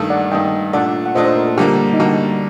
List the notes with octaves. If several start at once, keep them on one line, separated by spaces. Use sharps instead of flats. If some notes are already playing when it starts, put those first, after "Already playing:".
Already playing: G2 D#3 A3
D5 F#5
G2 D#3 A3 D#5 G5
A#2 A3 D4 D5 F#5
F#5
A#2 A3 D4 C5 D#5
C5
A#4
A4
D3 G3 A#3 G4
D#4
D3 G3 A#3 F#4